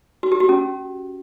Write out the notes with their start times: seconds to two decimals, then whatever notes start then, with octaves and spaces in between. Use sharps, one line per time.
0.23 F#4
0.32 G4
0.40 F#4
0.49 C#4